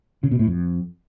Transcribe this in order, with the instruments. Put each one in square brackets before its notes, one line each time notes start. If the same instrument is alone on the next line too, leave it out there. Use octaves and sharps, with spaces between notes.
[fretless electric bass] C#3
B2
A2
F2